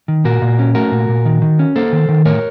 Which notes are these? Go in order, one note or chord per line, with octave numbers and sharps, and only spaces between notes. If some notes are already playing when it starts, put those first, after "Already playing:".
D#3
A#2 F#4 A#4
A#2
C#4
A3 F#4 A#4
A#2
A#2
D#3
D#3
C#4
A#3 A4 C5
D#3
D#3
A2 A#4 C#5